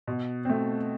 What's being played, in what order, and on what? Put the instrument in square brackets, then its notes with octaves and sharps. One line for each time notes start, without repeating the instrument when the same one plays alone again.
[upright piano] B2
A3 C4